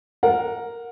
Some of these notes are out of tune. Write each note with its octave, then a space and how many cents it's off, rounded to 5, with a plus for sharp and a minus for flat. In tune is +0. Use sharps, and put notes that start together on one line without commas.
A#4 +0 F#5 -25